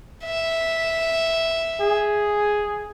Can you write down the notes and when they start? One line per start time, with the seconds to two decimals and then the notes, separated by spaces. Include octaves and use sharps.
0.25 E5
1.80 G#4